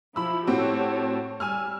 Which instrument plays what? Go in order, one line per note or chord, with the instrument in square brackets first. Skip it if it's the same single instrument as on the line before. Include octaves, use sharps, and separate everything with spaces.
[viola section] F3 E4 [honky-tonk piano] B5 E6
[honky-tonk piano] A2 C4 F#4 [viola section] G4 C#5 A5
[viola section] G3 [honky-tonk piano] G#5 E6 F6